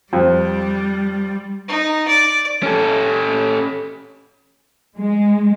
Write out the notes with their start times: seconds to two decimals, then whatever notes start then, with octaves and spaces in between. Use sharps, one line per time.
0.13 F2 G3
1.68 D#4
2.08 D5
2.63 C#4 A4
4.97 G#3